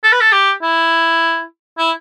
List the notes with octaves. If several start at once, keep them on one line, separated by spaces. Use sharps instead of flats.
A4
B4
A4
G4
E4
E4